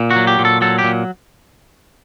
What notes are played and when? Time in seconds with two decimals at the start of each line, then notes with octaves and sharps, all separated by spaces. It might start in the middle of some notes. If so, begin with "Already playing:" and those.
Already playing: A#2
0.11 F#4
0.16 F#3
0.27 G4
0.39 A#2
0.45 A4
0.61 F#3 A4
0.79 G4
0.84 A#2